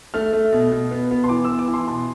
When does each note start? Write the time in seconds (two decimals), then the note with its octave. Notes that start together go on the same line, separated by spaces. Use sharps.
0.14 A3 F6
0.33 A3
0.52 B2
0.72 B2
0.91 B3
1.11 B3
1.24 C6
1.29 E3 D6
1.45 B3 E6
1.59 D6
1.68 E3
1.74 C6
1.87 B2 C6